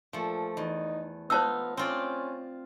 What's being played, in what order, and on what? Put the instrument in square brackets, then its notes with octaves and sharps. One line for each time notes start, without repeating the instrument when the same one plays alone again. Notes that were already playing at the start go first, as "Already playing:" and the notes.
[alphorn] A#2 [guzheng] F3 A3
[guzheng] E2 [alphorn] D#4
[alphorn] B3 [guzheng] D#4 F4 [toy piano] C5 A5 E6
[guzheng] C4 F4 D5 [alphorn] C#4